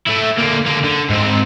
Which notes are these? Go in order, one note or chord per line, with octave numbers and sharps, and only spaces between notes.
A3 E4
D3 A#3
D3 A#3
D3
G#2 C4